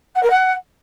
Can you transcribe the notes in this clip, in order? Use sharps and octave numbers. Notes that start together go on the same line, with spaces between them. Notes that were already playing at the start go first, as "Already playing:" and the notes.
F#5
A#4
F#5